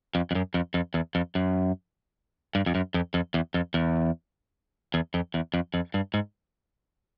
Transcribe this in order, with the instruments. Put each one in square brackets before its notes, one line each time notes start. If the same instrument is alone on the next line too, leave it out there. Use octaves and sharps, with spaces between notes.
[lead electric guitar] F2
F2
F#2
F2
F2
E2
F2
F#2
G2
F2
F#2
F2
F2
E2
F2
E2
E2
F2
E2
F2
F2
G2
G#2